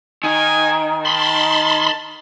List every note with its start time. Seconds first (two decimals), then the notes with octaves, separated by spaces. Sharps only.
0.24 D#3 G#5
1.05 A5 B5 C6